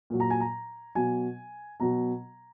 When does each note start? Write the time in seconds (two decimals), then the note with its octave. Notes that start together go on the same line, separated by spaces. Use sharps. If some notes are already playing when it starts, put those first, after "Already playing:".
0.10 A#2 F#3
0.20 A#5
0.30 G#5
0.40 A#5
0.95 B2 F#3 G#5
1.80 B2 F#3 A#5